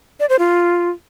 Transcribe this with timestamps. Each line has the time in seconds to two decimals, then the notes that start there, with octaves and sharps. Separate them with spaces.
0.20 D5
0.29 C5
0.39 F4